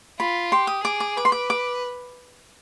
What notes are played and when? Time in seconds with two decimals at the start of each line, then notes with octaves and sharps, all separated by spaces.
0.19 F4 B5
0.52 G4 C6
0.67 D#6
0.84 G#4 D6
1.00 D6
1.16 B4 D6
1.25 C6
1.32 D6
1.50 D6